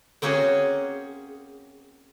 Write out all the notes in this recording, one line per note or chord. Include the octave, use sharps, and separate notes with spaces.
A#3 C4 C#4 F#4 G#4